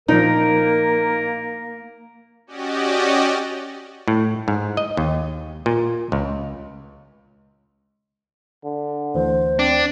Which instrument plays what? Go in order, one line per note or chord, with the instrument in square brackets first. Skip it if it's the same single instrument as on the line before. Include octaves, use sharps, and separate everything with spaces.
[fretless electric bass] A#2 F3 [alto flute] A#3 [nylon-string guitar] D#4 [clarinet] A#4
[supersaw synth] C#4 F#4 G4 D5 D#5
[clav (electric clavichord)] A2
G#2
D#5
D#2
A#2
C#2
[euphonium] D3
[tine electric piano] D2 E3 [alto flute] C5
[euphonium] C4 [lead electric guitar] D4